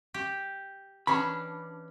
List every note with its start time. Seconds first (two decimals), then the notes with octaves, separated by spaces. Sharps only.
0.14 G4
1.07 E3 C#4 D4 B5